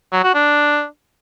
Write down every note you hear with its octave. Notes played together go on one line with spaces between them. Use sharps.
F#3
F#4
D4